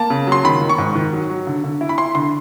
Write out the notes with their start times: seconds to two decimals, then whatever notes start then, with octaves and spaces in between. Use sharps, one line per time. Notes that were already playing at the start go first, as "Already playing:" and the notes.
Already playing: A#3 A5
0.10 C#3
0.27 F#3
0.32 C6
0.44 D#3 B5
0.62 D#3
0.69 C#6
0.78 G#2
0.96 D#3
1.13 F#3
1.30 F#3
1.47 D3
1.64 D3
1.81 E4
1.89 B5
1.98 E4 C6
2.15 D3 C6